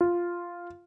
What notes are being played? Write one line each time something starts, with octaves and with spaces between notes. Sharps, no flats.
F4